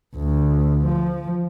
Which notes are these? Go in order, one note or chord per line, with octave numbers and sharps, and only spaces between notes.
D2
F3